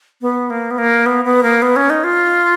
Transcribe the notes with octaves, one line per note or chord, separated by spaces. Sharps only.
B3
A#3
B3
A#3
B3
B3
A#3
B3
C#4
D#4
F4